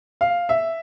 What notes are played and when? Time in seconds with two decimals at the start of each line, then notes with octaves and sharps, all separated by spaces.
0.21 F5
0.49 E5